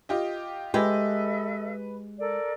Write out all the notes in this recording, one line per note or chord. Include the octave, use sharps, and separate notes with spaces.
F4 G4 D#5
G#3 G4 A4 B4 D#5 E5
A4 A#4 D5